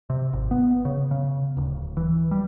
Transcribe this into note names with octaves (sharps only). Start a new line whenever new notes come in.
C3
G#1
B3
C#3
C#3
D1
E3
G3